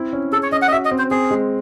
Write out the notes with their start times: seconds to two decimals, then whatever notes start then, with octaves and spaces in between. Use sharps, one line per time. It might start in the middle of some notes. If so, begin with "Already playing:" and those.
Already playing: C4 E4
0.13 C#4
0.32 G#4 A4
0.43 C#5
0.52 C#4 D#5
0.62 F#5
0.68 D#5
0.72 F#4 E5
0.85 D#5
0.91 C4
0.98 C5
1.11 C4 G#4
1.31 G#3